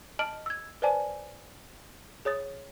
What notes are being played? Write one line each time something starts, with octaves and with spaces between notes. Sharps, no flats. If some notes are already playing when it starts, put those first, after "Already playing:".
D#5 A5 F6 D7 F#7
E6 G#6
B4 C5 D5 G#5 A5
G#4 C#5 D#6 A6